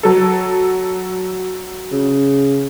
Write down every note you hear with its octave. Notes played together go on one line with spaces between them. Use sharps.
F#3 A4
C#3